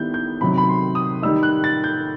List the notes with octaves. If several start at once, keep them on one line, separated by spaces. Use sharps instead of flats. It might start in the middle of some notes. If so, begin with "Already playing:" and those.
Already playing: D#3 G3 B3 E4 G6
G6
C3 D#3 F#3 B5
B5
C6
D#6
D#3 G3 D#4 E6
F#6
A6
G6